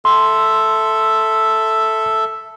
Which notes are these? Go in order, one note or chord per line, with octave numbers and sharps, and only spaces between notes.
A4 E5 C6